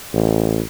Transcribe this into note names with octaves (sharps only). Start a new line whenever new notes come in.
A1